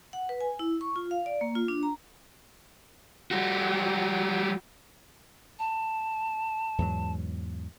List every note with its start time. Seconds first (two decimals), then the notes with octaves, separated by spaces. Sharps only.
0.13 F#5
0.29 B4
0.41 G#5
0.59 E4
0.81 C#6
0.96 F4
1.11 F5
1.26 D5
1.41 A#3
1.55 F4
1.68 D4
1.83 A#5
3.31 G3 F#4
5.59 A5
6.78 E2 G#2 F#3